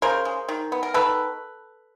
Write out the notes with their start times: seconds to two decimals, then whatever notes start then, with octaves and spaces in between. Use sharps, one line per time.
0.02 C#3 A#4 C5
0.25 G#3
0.49 D#3
0.72 B3
0.83 A#4
0.94 D#3 A4 B4